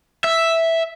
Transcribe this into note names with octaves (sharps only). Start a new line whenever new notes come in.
E5